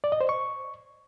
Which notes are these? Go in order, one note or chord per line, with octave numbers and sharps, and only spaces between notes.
D5
D#5
C5
C#6